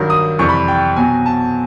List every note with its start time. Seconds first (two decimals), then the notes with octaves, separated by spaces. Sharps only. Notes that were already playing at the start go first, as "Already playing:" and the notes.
Already playing: G2 D#3 F#3
0.10 D#6
0.39 F2 C3 E3 G3 C#6
0.49 B5
0.68 G5
0.96 B2 F#3 G#5
1.26 A5